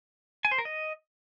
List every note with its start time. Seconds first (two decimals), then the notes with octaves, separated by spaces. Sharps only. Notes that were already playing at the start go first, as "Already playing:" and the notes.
0.45 G#5
0.52 C5
0.58 A#4
0.65 D#5